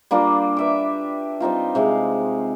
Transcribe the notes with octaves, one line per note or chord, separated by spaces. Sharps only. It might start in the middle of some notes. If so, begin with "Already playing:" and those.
G3 A#3 D4 F4
B4 E5 D6
G3 C4 D#4 F4
C3 G#3 F5